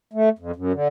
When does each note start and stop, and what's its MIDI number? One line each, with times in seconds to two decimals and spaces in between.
0.13 0.29 57
0.39 0.52 41
0.56 0.72 42
0.73 0.88 50